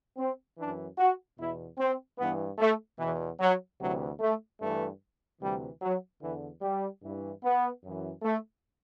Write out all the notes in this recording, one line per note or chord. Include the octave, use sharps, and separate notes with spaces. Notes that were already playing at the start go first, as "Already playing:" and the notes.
C4
F#2 E3 D4
F#4
E2 B2 E4
C4
G2 E3 B3
A3
E2 B2 E3
F#3
D2 C3 E3 F#3
A3
G2 E3 A3
D2 C3 E3 G3
F#3
E2 D3 E3
G3
G2 E3
B3
F#2 E3
A3